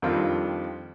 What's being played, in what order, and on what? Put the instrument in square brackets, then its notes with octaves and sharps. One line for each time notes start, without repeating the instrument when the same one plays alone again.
[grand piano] F2 D#3 G3 C4 D4 F4